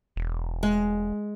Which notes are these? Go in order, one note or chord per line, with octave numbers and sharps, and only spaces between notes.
E1
G#3